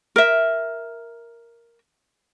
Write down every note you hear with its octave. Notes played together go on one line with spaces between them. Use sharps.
A#4 E5